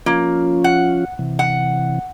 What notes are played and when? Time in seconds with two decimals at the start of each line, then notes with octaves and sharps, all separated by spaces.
0.06 F3 A#3 C#4 F4
0.64 F#5
1.19 C3 E3
1.39 F#5